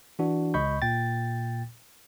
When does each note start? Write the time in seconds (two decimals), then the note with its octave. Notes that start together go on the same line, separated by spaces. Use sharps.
0.19 E3 D4 F#4
0.54 C#2 D#5 B5 C#6 G6
0.82 A#2 G5 A6